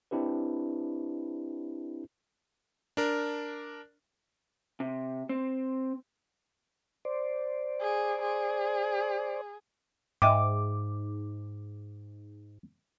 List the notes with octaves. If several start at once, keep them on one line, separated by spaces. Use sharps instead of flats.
C4 D4 E4 G4 B4
D4 A#4
C3
C4
C5 D5
G#4
G#4
G#2 D#5 E5 G5 D6